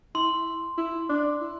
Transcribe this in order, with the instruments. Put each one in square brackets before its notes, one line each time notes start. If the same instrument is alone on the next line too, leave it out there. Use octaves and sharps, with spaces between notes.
[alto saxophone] E4 [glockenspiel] C6
[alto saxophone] E4
D4
E4